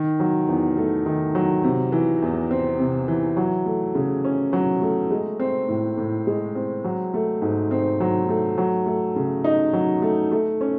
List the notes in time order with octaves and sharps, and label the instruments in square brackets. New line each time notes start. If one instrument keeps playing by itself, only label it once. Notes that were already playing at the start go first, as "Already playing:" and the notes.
Already playing: [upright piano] D#3
F#3
E2
A3
D#3
F#3
C3
E3
E2
C4
C3
E3
F#3
A3
C#3
C#4
F#3
A3
G#3
C4
A2
A2
G#3
C4
F#3
A3
G#2
C4
F#3
A3
F#3
A3
C#3
D#4
F#3
A3
A3
C#4